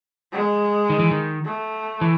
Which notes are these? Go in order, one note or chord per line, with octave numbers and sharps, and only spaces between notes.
G#3
D#3
E3
D#3
A3
E3